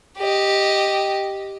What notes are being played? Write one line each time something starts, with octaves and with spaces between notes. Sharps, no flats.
G4 D#5